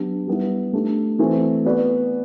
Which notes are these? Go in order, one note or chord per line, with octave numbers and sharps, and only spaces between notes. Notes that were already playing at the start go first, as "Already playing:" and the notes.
Already playing: F#3 B3 D4 G4
G3 B3 E4
A3 D4 G4
E3 A3 C4 F#4
B3 F#4 B4 D5